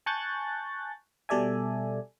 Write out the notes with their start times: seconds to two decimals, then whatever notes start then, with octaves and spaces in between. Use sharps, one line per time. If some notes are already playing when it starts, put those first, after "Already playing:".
0.06 G#5 A5 C#6 F#6 G6 A6
1.29 B2 G3 A4 D5 E5 G#5